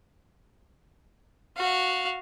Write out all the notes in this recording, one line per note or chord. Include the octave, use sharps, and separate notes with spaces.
F#4 F5